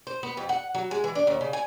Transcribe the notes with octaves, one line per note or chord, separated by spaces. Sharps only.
C5
B3
F2
F#5
F#3
G#3
E3
D4
D#2
C#3
G#5